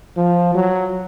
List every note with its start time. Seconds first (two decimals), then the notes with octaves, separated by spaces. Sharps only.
0.17 F3
0.55 F#3